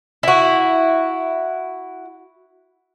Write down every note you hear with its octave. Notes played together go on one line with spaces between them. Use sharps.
E4 F#4